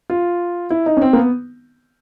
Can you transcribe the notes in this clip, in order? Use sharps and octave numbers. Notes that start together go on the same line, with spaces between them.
F4
E4
D#4
C#4
C4
A#3
B3